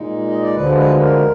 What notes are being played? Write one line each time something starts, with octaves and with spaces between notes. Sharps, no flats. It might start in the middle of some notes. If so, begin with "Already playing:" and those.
Already playing: A#2 G#3 D#4
D#5
D5
D2 D3 F3 G#3 B4
B4
A#4